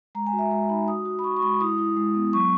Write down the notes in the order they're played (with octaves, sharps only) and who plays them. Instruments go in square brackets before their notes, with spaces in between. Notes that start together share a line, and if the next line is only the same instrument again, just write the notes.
[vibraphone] G#3 A#5
G#5
F#4
E5
G#3 G#5
D#4 B5
F#4 D#6
F#4
B5
F#4 C#6
C#6
G#3 B5
E4 D#6
E4
G#3
B3
F#3 C#6